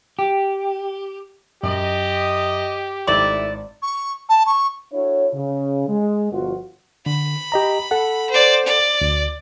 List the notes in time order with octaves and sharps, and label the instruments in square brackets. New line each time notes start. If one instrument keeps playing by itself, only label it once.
[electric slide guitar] G4
[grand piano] F#2 [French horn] G4 [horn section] D#5
[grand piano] G#1 D#4 [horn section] A3 E4 [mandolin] D5
[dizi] C#6
A5
C#6
[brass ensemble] D4 E4 F#4 A4 C#5
C#3
G#3
G1 B2 F3 F4 F#4
[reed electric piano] D3 [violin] B5
[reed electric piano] G4 D#5 A#5
A4 F#5
[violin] C5 D5
D5
[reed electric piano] D2